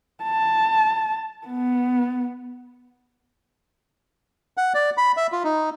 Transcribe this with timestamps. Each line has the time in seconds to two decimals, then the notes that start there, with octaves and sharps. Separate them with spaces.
0.23 A5
1.47 B3
4.57 F#5
4.74 D5
4.97 B5
5.17 E5
5.32 F4
5.44 D#4